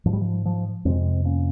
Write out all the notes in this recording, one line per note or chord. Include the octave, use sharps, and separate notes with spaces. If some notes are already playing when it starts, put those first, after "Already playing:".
G#2 F3
G3
F3
F3
F2 C3 G#3 C4
A#3 C#4